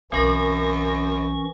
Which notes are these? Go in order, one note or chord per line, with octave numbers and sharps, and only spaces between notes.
B1 F#2 E3 C4 C#4 A#4 C#6 A#6